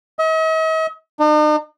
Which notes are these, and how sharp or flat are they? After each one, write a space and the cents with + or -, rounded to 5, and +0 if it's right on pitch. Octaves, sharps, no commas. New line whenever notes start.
D#5 +45
D#4 -45